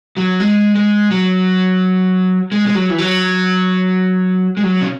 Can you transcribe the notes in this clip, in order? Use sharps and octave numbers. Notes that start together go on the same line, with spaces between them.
F#3
G#3
G#3
F#3
G#3
G#3
F#3
E3
F#3
G#3
F#3
C#3